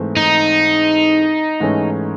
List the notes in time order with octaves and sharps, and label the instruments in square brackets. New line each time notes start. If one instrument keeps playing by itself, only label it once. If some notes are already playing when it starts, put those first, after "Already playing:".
Already playing: [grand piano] G#2 E3 A3 C4
[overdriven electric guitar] D#4
[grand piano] G#2 E3 A3 C#4